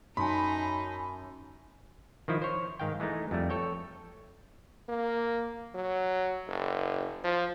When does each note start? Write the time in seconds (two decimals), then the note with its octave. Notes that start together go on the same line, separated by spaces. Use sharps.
0.17 F#2 D#4 G#5 A5 B5 C6
2.28 D#3 F3 E4
2.42 C5 C#5
2.80 G#2 D#3 F5 G5
3.00 E3 G#3 A3 D#4
3.31 F2 G3 A3
3.50 A4 C#5 G5
4.88 A#3
5.74 F#3
6.47 F#1
7.24 F3